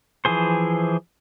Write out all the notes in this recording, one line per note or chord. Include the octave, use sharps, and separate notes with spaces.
E3 F3 G#4 C5